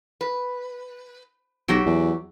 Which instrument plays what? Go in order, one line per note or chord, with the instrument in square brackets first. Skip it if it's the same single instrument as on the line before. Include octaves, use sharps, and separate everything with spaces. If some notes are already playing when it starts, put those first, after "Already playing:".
[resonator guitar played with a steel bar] B4
[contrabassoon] B1 [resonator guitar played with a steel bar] F#3 F#4 G4
[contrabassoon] E2